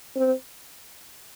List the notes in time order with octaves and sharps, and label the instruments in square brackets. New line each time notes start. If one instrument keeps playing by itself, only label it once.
[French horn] C4